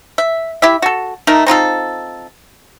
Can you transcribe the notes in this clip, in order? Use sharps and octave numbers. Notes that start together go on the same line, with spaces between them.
E5
E4 G4 E5
F#4 A4
A3 D#4 A#4
C4 D#4 F4 A4